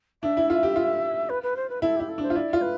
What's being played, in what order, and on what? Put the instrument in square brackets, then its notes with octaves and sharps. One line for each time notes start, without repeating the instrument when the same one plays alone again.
[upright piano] D4 [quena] E5
[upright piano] E4
F4
G4
F4
[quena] B4
B4
C5
B4
[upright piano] E4 [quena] A4
[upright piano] E4 [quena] G4
[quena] A4
[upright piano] D4 [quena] C5
[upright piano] F4
[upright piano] E4 [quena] D5
[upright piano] F4
[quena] B4